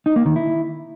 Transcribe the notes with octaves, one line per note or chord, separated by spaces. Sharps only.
D#4
A#3
D#3
E4